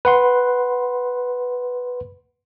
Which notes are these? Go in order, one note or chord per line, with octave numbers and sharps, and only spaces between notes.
B4 F#5 C6